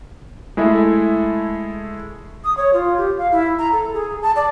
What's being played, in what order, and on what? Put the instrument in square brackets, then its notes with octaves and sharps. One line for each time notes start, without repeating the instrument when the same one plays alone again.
[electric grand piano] G#3 A3 E4 G#4 A4 E5
[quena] D#6
C#5
F4
G4
F5
E4
A#5
A4
G#4
A5
D5